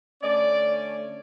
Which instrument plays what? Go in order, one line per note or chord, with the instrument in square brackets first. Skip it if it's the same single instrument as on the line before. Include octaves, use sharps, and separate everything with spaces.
[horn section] D3 A3 C#4 D5